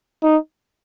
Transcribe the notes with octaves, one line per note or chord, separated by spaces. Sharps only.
D#4